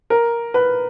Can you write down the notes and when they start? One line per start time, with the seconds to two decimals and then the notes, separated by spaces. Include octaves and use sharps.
0.10 A#4
0.54 B4